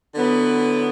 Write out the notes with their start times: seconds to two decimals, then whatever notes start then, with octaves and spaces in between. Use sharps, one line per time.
0.15 D3 F#3 B3 E4